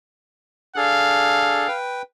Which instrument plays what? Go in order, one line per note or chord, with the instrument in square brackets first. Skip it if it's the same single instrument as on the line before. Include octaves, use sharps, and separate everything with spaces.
[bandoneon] D4 G#4 A4 [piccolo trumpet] F5
[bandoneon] B4 G5